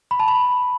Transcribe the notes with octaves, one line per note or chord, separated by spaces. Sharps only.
B5
A5
B5